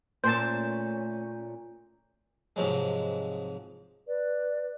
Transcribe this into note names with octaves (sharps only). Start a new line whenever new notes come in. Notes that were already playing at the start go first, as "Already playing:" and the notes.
A#2 A3 C#4 C5 A5 G6
G#2 C3 F3 F#3 G#3
B4 D5